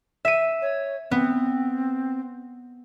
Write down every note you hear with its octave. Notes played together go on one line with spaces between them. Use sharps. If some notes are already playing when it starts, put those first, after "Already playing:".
E5 D#7
C#5
B3 C4